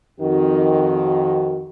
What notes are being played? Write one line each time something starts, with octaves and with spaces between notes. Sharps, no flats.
F2 D#3 F#4